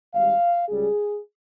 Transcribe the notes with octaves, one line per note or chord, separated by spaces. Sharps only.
G#1 G#2 G3 F5
C#2 C#3 G3 G#4